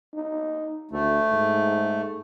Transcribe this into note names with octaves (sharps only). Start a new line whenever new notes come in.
D#4
D2 A3
G#2